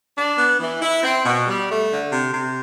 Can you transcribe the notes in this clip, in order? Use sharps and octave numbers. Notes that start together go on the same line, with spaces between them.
D4
B3
E3
E4
C4
B2
G3
A3
D3
C3
C3